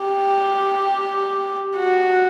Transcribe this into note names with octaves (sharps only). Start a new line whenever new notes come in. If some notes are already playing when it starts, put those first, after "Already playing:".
Already playing: G4
F#4